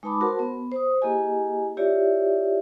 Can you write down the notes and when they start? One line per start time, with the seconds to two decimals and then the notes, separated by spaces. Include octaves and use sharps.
0.03 G#3 D#4 B4 A5 B5 D6
0.21 F#4 A#4 C5 F#5 A5 C6
0.39 B3
0.72 C5 D#6
1.02 A#3 E4 G4 G#4 D#5 G#5
1.77 E4 F4 G4 C#5 D5 E5